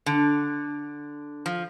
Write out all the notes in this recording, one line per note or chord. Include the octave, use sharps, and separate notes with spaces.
D3
F3